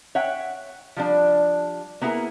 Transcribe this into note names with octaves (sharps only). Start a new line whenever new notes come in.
C#5 E5 F#5 G5
F3 G3 D4
A#3 B3 D4 E4 G#4 A#4